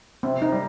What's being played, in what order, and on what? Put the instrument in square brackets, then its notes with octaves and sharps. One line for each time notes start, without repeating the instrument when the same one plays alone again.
[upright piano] C3 [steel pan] C4
[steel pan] D#4
[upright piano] G3